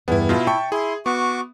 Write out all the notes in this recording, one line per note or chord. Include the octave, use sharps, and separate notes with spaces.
E2 G2 B3 E4
B2 E4 F4
E5 G5 A5 C#6
E4 G#4 C6
B3 F#4 C#6 D6